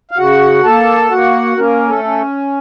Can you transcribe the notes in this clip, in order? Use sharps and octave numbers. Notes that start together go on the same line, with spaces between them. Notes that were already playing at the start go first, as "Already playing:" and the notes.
F5
C#3 F#4 F#5
A#3 A4 A5
A#3 F#4 F#5
A#3 C#4 A#4
A3 A4
C#4